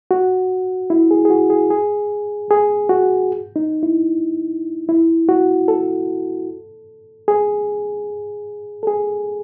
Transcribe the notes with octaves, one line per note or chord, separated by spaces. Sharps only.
F#4
E4
G#4
G#4
F#4
G#4
G#4
G#4
F#4
D#4
E4
E4
F#4
A4
G#4
A4
G#4